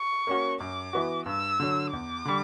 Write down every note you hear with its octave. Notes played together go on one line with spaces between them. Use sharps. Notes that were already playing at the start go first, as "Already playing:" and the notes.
Already playing: C#6
A#3 C#4 F#4
F#2 D6
E3 B3 F#4
G2 E6
D3 F#3
E2 D6
D3 G3